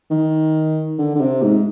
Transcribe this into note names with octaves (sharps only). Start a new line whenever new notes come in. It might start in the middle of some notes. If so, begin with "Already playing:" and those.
D#3
D3
D3
C3
G#2